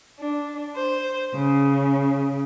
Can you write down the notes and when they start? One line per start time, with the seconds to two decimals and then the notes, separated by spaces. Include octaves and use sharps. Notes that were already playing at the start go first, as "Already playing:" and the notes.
0.21 D4
0.75 C5
1.34 C#3